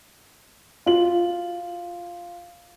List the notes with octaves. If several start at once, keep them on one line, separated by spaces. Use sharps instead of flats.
F4 F#4 F#7